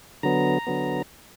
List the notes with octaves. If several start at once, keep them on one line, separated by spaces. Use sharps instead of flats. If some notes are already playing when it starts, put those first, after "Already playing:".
D3 F#3 B3 A#5
D3 F#3 B3